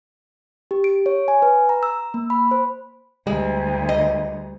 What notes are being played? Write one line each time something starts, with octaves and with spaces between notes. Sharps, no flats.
G4
D7
C#5
G#5
B4
A#5
E6
A#3
B5
C5
D2 G3 G#3
D#5